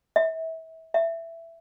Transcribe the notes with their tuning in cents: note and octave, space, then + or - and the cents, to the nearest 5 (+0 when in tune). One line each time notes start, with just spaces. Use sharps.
E5 -30
E5 +10